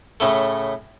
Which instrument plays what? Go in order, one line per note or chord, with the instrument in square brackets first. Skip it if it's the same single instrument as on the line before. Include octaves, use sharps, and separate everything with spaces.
[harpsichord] A2 C#3 A3